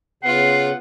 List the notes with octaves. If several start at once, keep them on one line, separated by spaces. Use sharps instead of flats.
C#3 B3 F4 F#5 C7